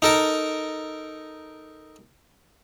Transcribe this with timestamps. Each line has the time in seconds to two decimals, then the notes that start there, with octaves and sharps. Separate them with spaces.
0.02 D#4 A4 A#4